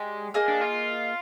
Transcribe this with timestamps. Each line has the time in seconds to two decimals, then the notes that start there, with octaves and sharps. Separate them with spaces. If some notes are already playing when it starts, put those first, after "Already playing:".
Already playing: G#3 G4 D5 G#5
0.34 A#3 D#4 G#4 D#5
0.48 D4
0.61 F4